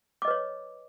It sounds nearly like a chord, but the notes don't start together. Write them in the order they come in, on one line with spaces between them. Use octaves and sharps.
D6 D#5 B4 C#5